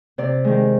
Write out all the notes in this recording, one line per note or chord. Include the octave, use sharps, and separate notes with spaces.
C3 D5
D#3 G#3